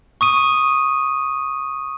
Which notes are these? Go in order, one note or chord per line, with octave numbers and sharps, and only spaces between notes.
C#6 D#6 D#7